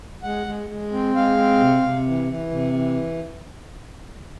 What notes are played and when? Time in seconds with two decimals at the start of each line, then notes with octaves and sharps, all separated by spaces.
0.23 G#3 F#5
0.47 G#3
0.69 G#3
0.92 C4
1.15 G#3 F5
1.37 C4
1.60 C3
1.82 C3
2.06 E3
2.28 E3
2.51 C3
2.74 E3